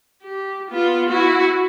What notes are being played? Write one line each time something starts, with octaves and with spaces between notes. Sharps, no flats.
G4
B3 F4
E4 F#4